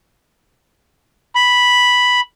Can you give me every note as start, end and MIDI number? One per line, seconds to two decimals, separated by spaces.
1.35 2.20 83